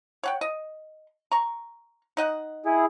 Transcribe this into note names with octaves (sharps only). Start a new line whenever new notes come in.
C#5 F#5 G5
D#5
A#5 C#6
D#4 D#5 F#5
E4 G#4